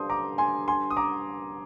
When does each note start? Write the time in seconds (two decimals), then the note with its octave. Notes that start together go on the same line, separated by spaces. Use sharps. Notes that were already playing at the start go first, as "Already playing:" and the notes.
Already playing: G2 D3 F3 C6 D#6 G6
0.10 A#5 D6
0.38 G#5 C6
0.68 G#5 C6
0.90 D#6
0.97 A#5 D6